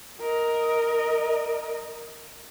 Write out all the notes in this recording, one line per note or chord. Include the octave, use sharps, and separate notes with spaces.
A#4 D#5